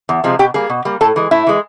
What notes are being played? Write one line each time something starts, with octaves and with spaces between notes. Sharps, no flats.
E2
C3 F3 G#3
B2 G4
G3 A#3 G#4
B2
G3 A#3
A2 A4
E3 G#3
A2 E4
E3 G#3